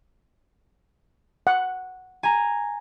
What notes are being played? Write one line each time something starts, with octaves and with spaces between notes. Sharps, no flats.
F#5
G#5 A#5